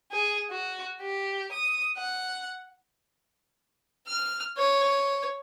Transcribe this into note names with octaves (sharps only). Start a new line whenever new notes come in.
G#4
F#4
G4
D#6
F#5
F6
C#5